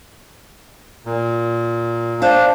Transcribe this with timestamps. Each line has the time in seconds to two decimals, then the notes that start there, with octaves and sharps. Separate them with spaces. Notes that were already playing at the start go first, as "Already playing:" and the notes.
1.06 A#2
2.22 D4 C5 F5